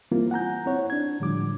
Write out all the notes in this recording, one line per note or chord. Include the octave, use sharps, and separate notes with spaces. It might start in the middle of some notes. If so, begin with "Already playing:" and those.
E3 G3 A#3 C4 E4 F4
F#5 G#5 A#5 G6
C4 E4 C#5 F#5
D4 G#6
A2 D3 F3 G3 D6